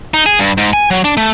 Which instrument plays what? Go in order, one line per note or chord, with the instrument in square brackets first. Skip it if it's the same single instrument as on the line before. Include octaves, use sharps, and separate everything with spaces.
[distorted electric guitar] D#4
G#4
G2
G#2
G#5
F#3
D4
A3